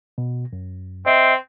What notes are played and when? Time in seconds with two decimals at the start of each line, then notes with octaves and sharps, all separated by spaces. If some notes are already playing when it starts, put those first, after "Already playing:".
0.18 B2
0.53 F#2
1.06 C4 D#5 E5